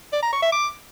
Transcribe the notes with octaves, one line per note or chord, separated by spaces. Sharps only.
D5
A#5
C#6
E5
D6